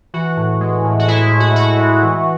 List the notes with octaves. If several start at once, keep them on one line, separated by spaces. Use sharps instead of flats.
E3 F#4
A2
G#3
A2
F#4
G#3 E4
A2
F#4
A2 F#4
G#3
E3